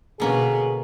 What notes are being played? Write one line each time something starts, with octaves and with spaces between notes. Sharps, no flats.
B2 D3 A#3 B3 C#4 G#4